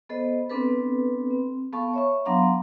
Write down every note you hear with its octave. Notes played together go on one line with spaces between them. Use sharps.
B3 A4 C5 D#5
B3 C4 D4 A4 B4
C4
B3 A4 F5 A5 C#6
C#5 E5 C#6
F#3 B3 D4 F5 A#5 C6